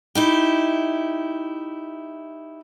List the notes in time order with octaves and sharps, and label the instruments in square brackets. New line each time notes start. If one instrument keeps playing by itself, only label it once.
[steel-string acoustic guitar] D#4 E4 G4